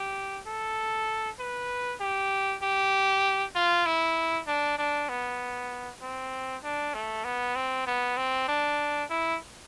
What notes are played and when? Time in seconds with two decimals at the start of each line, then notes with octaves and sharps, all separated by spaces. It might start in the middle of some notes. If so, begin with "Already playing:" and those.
Already playing: G4
0.47 A4
1.39 B4
2.01 G4
2.63 G4
3.55 F4
3.86 E4
4.47 D4
4.78 D4
5.09 B3
6.02 C4
6.63 D4
6.94 A3
7.25 B3
7.56 C4
7.87 B3
8.17 C4
8.48 D4
9.10 E4